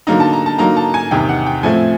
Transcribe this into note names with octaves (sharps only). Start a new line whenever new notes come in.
D3 F#3 A#3 D#4 A#5
A5
A#5
A5
D3 F#3 A#3 D#4 A#5
A5
G#5
E2 C3 D#3 G5
F#5
G5
A2 F3 A3 C4 E4 G#5